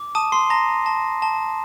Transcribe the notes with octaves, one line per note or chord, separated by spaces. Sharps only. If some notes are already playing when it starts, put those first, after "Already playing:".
Already playing: D6
A5 D#6 D#7
C6 C7
A5 A#5 A#6
A5
A5